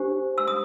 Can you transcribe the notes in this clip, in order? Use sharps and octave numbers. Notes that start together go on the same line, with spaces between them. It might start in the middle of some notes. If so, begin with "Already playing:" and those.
Already playing: D4 G4 C5
E6
D#6